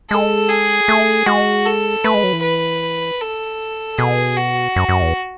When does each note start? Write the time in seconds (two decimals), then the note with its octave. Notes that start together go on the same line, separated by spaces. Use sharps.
0.10 G#3 A4
0.49 G#4
0.88 A3
1.26 G#3 F#4
1.66 A4
2.04 A3 B4
2.14 G#3
2.24 F#3
2.33 E3
2.43 B4
3.21 A4
3.98 B2 G#4
4.37 F#4
4.76 F#2
4.89 F#2
5.02 E2